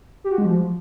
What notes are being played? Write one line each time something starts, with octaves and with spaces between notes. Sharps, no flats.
G4
F#4
G#3
F3